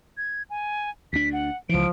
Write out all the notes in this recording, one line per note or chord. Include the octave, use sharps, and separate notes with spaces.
G#6
G#5
D2 D4 B6
F#5
C#2 E3 F3 D7